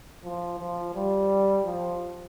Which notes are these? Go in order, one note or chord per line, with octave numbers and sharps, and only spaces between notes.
F3
F3
G3
F3